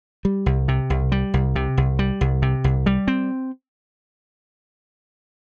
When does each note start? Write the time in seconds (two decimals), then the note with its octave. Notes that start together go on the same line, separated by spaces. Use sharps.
0.25 G3
0.46 C2
0.68 C3
0.90 C2
1.12 G3
1.34 C2
1.56 C3
1.77 C2
1.99 G3
2.21 C2
2.42 C3
2.64 C2
2.86 G3
3.08 C4